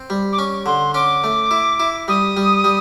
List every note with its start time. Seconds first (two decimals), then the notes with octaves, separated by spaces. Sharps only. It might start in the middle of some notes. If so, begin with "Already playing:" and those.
Already playing: C4
0.10 G3
0.32 D6
0.38 C#4 C#6
0.66 D3 C6
0.94 C#4 D6
1.24 A3
1.51 E4
1.80 E4
2.08 G3 D#6
2.37 G3
2.64 G3